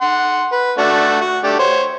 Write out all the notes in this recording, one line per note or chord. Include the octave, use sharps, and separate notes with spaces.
F#5 C6
B4
A3 D4 F#4
F#4
A3 D4 G4
C5 C#5